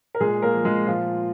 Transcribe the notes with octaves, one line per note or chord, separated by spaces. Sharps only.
A#4
A#2 G#3 G#4
A#3 A#4
F3
G#3 G#4
A#2 F3 F4